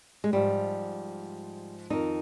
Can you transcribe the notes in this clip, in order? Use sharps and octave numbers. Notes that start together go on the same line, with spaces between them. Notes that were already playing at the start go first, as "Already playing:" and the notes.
G#3
G#2 F3 G3
F2 D#3 D#4